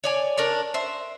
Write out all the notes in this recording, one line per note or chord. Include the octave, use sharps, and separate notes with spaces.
C#5 D5 G#5
D4 A#4 C#5 D5
C5 E5